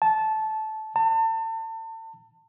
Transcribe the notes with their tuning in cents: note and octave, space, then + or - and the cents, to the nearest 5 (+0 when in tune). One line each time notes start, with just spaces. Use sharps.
A5 -15
A5 +35